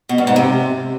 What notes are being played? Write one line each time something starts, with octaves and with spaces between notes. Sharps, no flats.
B2
G2
G#2
C3